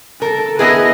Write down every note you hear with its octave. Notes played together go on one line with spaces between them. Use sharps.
A4 A#4
B3 E4 G#4 B4 D#5